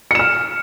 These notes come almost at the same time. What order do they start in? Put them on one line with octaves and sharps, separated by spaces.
C#7 E7 F6